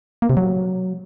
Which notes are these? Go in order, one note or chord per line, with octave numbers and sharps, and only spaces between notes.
A#3
C3
F#3